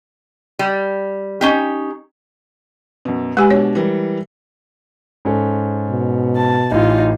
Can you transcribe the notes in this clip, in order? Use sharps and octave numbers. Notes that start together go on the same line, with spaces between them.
G3
C#4 D#4 G4
F#2 B2
G#3 G4 B4 G#5
B2 D4 C#5
E3 G3 A#4
G#2 C#4 A4
B2
A5
A1 E3 D#4 F4